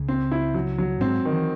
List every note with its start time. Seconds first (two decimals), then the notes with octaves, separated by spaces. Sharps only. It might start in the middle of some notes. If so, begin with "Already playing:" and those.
Already playing: C#2 C#3
0.08 C4
0.32 E4
0.54 F#3
0.78 F#3
1.01 G#2 G#3 C4
1.25 D#3
1.33 E3